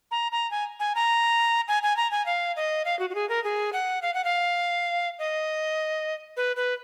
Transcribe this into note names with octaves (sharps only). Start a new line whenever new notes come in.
A#5
A#5
G#5
G#5
A#5
G#5
G#5
A#5
G#5
F5
D#5
F5
F#4
F#4
G#4
A#4
G#4
F#5
F5
F#5
F5
D#5
B4
B4